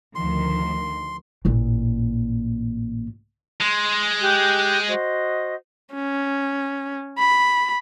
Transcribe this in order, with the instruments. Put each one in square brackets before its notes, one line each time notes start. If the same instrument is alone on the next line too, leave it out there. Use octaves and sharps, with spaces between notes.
[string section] D2 D#3 F3 [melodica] C6
[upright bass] A1 A#2
[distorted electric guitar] G#3 [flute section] C6
[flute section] G4 F#6 G6
F#4 C5 D#5
[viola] C#4
B5